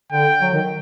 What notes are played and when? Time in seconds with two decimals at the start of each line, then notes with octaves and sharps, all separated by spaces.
0.12 D3 G5
0.42 F#3
0.54 D#3